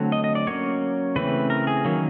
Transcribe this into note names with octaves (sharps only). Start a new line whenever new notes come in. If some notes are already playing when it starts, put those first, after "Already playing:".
Already playing: D3 F#3 A3 C4
D#5
D#5
D5
F#3 A#3 C#4 C#5
C#3 E3 A3 C4 B4
A#4
G#4
D#3 F#3 A#3 C#4